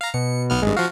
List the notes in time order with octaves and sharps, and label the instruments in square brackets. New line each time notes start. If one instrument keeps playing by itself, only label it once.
[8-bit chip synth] F5 A#5
[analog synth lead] B2 [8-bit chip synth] C#7
[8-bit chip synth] B1 B3 F6
[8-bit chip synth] G#1 G2 [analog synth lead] G#3
[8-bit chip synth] F3 F#4 [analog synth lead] F5